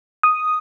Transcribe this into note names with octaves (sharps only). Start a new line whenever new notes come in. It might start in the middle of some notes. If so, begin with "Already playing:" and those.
D#6